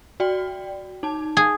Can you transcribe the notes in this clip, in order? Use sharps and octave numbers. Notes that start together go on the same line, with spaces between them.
F#4 D5 G5
D#4 A5
G#4